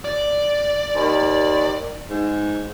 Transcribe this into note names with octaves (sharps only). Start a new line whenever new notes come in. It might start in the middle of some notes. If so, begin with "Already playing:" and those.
D5
D#2
G#2